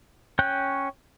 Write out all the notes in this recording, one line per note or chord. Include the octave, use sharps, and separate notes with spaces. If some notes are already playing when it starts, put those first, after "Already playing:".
C#4 C#5 G5 F#6 G6